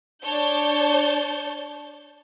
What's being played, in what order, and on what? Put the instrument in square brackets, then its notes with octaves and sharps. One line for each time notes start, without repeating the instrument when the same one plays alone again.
[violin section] D4 C#5 A5 G6